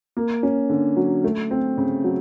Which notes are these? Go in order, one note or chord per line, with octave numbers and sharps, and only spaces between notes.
A#3
C#4
D3
F#3
A3
C4
C#3
F#3